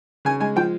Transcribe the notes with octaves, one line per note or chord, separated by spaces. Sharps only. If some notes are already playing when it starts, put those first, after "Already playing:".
C#3 G#5
G#3 G#5
F3 G5